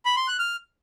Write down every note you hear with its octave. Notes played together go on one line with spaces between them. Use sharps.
B5
C6
F#6
F6